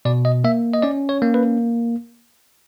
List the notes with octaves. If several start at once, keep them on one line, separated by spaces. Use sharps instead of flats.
B2 D5
D#5
A#3 E5
D#5
C#4 D5
C#5
A#3
B4